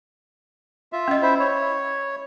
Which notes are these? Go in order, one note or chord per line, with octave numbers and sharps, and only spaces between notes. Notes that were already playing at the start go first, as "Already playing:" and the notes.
F4 E5
C#4 D#5
E4 C5 E5
C#5